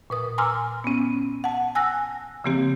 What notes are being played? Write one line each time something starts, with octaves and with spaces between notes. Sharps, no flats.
A#2 B4 D#6
G#5 A#5 C6 D6 E6 F6
B3 C#4
F#5 A5
G#5 E6 F#6 A#6
C#3 F3 A#3 C4 G4